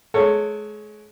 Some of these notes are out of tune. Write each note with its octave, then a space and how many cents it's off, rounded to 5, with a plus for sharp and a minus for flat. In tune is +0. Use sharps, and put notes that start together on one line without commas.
G#3 +35 A4 +30 C#5 +0